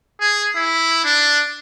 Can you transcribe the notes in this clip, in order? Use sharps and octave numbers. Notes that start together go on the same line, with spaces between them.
G#4
E4
D4